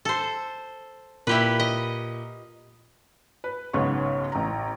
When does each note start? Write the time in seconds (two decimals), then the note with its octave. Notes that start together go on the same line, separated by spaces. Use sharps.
0.05 A4 C5
1.27 A#2 E4 G4 B4
1.60 D#5
3.44 B4
3.73 B1 G#2 C#3 B3 C#5 C#6
4.32 A1 A#5